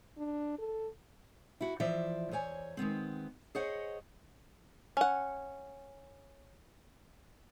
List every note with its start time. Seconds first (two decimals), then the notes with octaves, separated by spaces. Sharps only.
0.18 D4
0.59 A4
1.61 E4 F#4
1.80 E3 F3 C5 D5 E5
2.31 E2 C5 C#5 G#5
2.77 D#3 G#3 B3 C4
3.55 G#4 C5 C#5 D#5 F#5
4.97 C#4 F#5